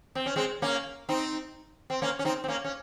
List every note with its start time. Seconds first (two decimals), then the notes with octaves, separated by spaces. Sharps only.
0.15 C4
0.26 C#4
0.36 G#3 C4
0.62 A#3 C#4
1.09 C4 D#4
1.90 C4
2.02 A#3 C#4
2.19 C#4
2.25 C4 D#4
2.44 C4
2.48 A#3 C#4
2.64 C#4